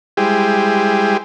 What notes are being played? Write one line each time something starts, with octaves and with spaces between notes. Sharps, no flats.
G3 G#3 E4 G4 G#4 C5